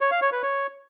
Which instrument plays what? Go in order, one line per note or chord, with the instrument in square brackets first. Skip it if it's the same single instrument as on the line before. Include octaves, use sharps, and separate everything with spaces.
[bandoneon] C#5
F5
C#5
B4
C#5